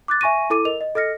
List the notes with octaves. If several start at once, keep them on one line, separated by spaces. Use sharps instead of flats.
D6 F#6 A6
E5 G#5 C#6 A#6 D#7
E4 A4 D6 D#7
A#4 D#5 F7
D#5
A4 D#5 F6 A#6 C#7